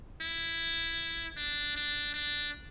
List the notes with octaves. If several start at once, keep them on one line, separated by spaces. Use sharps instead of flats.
E4
D4
D4
D4